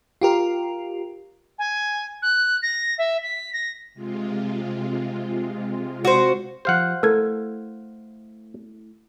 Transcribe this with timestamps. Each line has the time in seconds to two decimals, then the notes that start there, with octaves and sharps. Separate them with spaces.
0.21 F4 G4 A#4
1.58 G#5
2.22 F#6
2.62 A#6
2.98 E5
3.23 B6
3.53 A#6
3.94 C3 G#3 F4
6.05 F#4 C5
6.65 F3 G4 C5 F5 F#5
7.03 A3 E4 A4 A#4 G#6